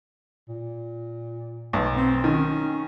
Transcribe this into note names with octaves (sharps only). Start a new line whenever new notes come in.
A#2
B1
C4
D#3 C#4